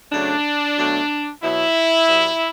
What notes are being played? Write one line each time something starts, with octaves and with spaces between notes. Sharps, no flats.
C#3 F#3 A3 D4
B2 F#3 A3
B2 F#3 B3 E4
B2 G3 B3